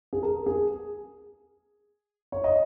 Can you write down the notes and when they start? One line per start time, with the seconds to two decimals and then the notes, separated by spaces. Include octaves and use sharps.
0.13 G#4
0.23 A#4
0.46 G#4
2.32 C#5
2.44 D#5